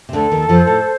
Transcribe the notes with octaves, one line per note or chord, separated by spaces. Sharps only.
C3
D2 D3 A4
D#2 D#3
F2 F3 C5
A2 A3